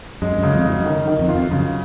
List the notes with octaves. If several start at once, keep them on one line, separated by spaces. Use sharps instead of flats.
F#2 G#3
F#2 C#3
F2
F#2 D#4
D#3
D#3
F2
F4
F2
F#2 C#3